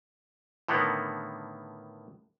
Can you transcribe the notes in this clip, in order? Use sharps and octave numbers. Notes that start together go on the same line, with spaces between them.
A2 D3 D#3 A#3 B3